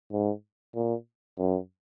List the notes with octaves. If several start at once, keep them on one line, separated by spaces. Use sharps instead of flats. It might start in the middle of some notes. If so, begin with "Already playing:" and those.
G#2
A#2
F#2